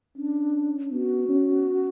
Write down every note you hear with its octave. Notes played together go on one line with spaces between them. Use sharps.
C#4 D4
B3 F#4
C#4